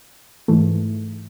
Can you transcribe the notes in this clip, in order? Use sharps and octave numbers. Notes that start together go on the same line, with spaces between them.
G#2 E3 A3